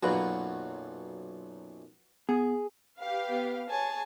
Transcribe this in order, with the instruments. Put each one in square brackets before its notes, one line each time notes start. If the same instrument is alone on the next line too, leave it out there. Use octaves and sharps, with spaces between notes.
[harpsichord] B1 F#2 A#2 [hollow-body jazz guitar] F#4 B4
[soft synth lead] B3 [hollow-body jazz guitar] G#4
[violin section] G4 B4 F5
[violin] B3
[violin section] G#4 C#5 [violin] G#5 A5